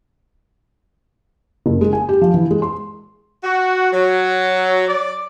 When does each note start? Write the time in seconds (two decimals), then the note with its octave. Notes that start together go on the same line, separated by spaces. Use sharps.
1.66 F#1
1.81 G#3
1.93 G#5
2.09 G4
2.21 F3
2.34 E3
2.51 G#3
2.62 C6
3.43 F#4
3.93 F#3
4.88 D5